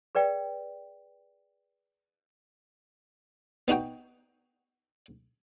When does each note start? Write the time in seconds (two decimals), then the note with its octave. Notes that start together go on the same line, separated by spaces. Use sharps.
0.15 G#4 B4 D5 G5
3.68 B3 D#4 F#4 G5